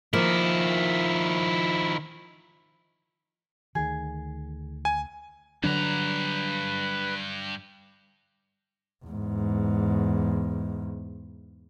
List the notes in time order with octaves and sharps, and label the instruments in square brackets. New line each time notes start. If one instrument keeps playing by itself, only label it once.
[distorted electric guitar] D#3 E4 [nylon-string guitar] F3 A#3
[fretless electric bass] D2 D#3 [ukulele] G#4
[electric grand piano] G#5
[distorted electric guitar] G2 A#5 [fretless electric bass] D3 F#3 D4 [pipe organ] B4
[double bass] E2 G#2